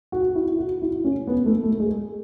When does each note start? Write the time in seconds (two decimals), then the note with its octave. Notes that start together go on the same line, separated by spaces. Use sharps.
0.12 F#4
0.35 E4
0.58 F#4
0.82 E4
1.05 C#4
1.27 B3
1.46 A3
1.63 A3
1.80 G#3